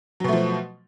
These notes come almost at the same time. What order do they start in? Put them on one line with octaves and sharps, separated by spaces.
F#3 B2 A3 F3